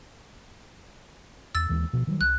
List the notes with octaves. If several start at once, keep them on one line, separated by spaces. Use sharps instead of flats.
E2 E6 A6
D#2 E3 G#3
B2 F3
D#3 F#3 G3
C2 F#6